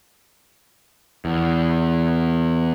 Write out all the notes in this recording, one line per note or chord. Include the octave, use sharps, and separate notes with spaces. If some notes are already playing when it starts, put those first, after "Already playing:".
E2